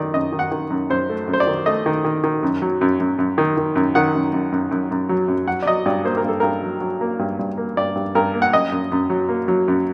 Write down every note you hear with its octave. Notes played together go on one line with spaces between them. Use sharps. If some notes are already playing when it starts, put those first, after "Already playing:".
Already playing: F#2 D#3 A3 D5
F#2 D#5
D#3
F#5
D#3
F#2
F#2 C5
A3
F#2
C5
D5
D#3
A3 D#5
D#3
D#3
D#3
F#2
F#3
F#2
F#2
F#2
D#3
D#3
F#2
D#3 F#5
F#2
F#2
F#2
F#2
F#2
F#3
F#2
F#3 F#5
D5
F#3 D#5
G2 D5
A#3 C5
A#4
G2 A4
G2 A#4
F#3
F#3
A#3
G2
G2
A#3
G2 D5
G2
G2 A#4
A#3
F#5
F#2 D#5
F#2
F#2
F#3
A#3
F#3
F#2